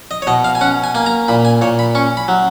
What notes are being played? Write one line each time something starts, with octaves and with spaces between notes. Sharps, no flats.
D#5
C#5
B2 D#5
F5
G#5
C#4 F#5
G#5
A#3 G#5
A#5
A#2 B5
G#5
A#2 C#5
B5
C#4 C#6
B5
F#3